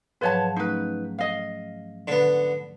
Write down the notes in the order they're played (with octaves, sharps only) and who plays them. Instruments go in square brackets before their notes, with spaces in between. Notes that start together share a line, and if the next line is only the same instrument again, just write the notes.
[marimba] G#2 F3 F#3 [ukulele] B4 C#5 A5
[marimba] A3 C#4 [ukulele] D#4 B4
[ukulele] D#5 F5
[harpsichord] D3 B3